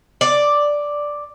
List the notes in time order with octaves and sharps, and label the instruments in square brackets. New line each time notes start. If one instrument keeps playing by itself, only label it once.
[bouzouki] D5